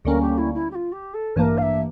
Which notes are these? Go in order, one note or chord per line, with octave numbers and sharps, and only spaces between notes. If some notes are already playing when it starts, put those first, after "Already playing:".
D2 D3 G3 A#3 C#4 A#4
G4
E4
E4
G4
F4
G4
A4
A1 G2 E3 A#3 D4 A#4 C#5
F5
E5